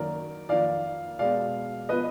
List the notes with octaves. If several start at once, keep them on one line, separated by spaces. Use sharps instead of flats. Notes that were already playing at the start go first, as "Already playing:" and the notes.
Already playing: F#2 D#3 F#3 A#3 A#4 D5
F2 D#3 A#3 D5 F5
B2 G#3 B3 D5 F5
F3 B3 B4 D#5